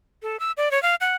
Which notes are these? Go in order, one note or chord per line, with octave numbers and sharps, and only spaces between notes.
A4
E6
D5
C#5
F5
F#5